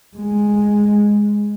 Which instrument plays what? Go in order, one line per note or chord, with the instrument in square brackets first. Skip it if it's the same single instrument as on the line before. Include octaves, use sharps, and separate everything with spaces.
[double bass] G#3